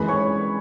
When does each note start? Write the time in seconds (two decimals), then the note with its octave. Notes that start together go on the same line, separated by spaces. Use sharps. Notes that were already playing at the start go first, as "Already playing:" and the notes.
Already playing: F#2 E3 G#3 B4 B5
0.08 C#5 C#6